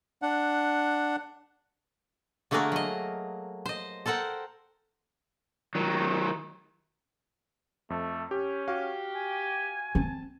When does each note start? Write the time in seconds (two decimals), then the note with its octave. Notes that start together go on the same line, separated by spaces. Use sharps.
0.22 D4 F#5
2.51 D3 A3 A#3 F#4 G#4 A#4
2.72 F#3 D#5
3.66 C5 D#5
4.06 A4 A#4 C5 F#5 G5
5.75 D#3 F#3
7.90 F2 A3
8.31 C#4 G4
8.68 F#4 G4 F5
9.16 G#5
9.95 C4 A5